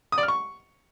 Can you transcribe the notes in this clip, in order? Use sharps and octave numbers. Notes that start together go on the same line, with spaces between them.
D#6
D5
F6
C#6